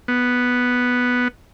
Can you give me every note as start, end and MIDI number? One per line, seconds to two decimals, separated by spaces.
0.08 1.28 59